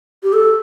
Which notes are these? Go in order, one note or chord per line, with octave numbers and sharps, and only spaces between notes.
G4
A4